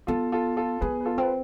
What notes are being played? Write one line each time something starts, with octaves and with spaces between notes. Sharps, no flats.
B3 F4 A4
F4 A4
F4 A4
B3 G#4 B4
B4
F4 A4
C4 B4